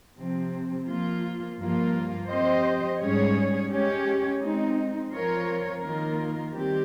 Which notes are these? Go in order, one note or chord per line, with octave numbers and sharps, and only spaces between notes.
C3 F3 C4
F3 A#3 F4
G2 F3 A#3 F4
F3 C4 G4 C5 D#5
G#2 G3 C#4 G#4 C#5
G#3 C#4 G4 C#5
G#3 C4 D#4
F3 C4 F4 A#4 C#5
D#3 A#3 F4 A#4
D#3 G3 C4 G4